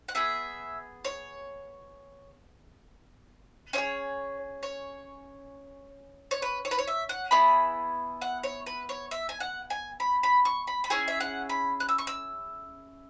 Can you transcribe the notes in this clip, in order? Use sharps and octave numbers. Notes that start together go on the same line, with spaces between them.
F#5
B3 G#4 E5
C#5
C#4 E4 G#4 C#5
C#5
C#5
B4
C#5
B4
C#5
E5
F#5
B3 E4 G#4 B5
F#5
C#5
B4
C#5
E5
G#5
F#5
G#5
B5
B5
C#6
B5
B5
C#4 E4 G#4 G#5
E5
F#5
B5
F#6
E6
C#6
E6